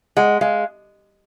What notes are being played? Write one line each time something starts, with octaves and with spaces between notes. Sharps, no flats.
G#3 F#5
G#3 F5